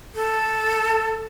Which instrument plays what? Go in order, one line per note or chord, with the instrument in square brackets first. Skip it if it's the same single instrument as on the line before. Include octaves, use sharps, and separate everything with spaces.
[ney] A4